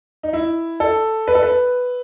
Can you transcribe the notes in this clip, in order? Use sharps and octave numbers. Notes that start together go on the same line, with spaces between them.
D#4
E4
A4
B4
A4
B4